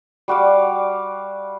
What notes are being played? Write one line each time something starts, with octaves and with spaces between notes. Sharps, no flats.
G3 F#4 F5 D6